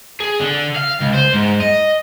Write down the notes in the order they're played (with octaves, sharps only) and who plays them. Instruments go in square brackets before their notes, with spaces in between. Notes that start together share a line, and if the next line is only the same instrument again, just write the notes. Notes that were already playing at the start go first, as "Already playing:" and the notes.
[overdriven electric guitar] G#4
D3
F5
C#2
C5
G#2
D#5